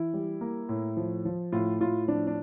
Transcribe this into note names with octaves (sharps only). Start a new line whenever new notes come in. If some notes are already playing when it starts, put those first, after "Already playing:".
Already playing: E3 E4
G3
A#3
A2
F3
F3
A2 F4
A2 F4
F3 D4
D4